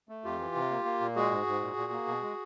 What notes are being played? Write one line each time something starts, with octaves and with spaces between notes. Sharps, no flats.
A3
F2 F4 G4
E3
C3
A#3
A#3
A#2
G#3 F#4 G#4
G#2
G#2
A#2
A#2
A#3
B2
G#3